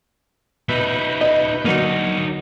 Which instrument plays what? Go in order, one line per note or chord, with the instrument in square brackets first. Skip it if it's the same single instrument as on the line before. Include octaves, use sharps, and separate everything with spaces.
[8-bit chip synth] B2 B4 G6 [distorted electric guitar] D#4 E5
[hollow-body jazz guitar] D#5
[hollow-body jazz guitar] D3 F#3 A#3 [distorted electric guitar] D#4 C#5